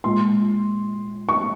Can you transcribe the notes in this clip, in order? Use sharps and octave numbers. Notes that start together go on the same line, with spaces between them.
A#2 G#3 C6
C#6